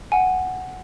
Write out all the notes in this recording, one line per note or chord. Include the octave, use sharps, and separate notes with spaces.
F#5 G#5